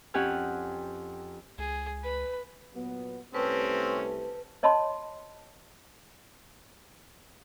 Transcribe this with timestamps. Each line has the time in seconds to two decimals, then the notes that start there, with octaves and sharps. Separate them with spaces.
0.14 F2 C#4 G4 F#5 G#5 F6
1.58 C#2 G#4
2.04 B4 B5
2.73 A#2 F#3 B3
3.34 C2 A3 C4 C#4 G4 B4 A5
4.63 C#5 D#5 A5 B5 C6